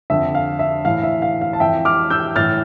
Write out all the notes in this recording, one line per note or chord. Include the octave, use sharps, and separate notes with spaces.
F2 D3 E5
F5
E5
A2 E3 F5
E5
F5
F5
A5
F2 E3 E5 G5
D6 F6
E6 G6
A2 E3 F6 A6